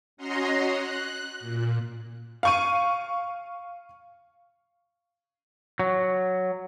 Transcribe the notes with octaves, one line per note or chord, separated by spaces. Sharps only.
C#4 F#4 D#5 A#5 C6
F#6
A#2
F5 C#6 D#7
F#3